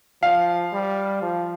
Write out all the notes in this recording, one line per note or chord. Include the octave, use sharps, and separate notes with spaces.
F3 F5
G3
F3